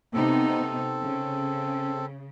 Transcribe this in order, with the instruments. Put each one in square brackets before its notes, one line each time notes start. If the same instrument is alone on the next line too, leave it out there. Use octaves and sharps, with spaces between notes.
[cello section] C3 B3 D#4 [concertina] C4 A4
[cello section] C#3